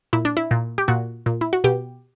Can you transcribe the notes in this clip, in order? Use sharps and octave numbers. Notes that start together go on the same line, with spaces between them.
A#2 E4
D4
E4
A#2
G4
A#2 F#4
A#2
E4
F#4
B2 G4